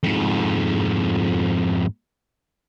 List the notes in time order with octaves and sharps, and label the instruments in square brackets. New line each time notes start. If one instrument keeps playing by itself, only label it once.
[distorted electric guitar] F2 G#2